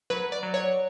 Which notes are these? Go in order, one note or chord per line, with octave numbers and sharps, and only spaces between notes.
F#3 B4
D5
F#3
C#5